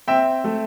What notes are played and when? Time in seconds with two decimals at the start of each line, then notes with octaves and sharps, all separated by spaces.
0.08 C4 E5 G5
0.44 A3